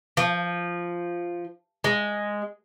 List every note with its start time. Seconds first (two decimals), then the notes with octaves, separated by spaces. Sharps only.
0.17 F3
1.84 G#3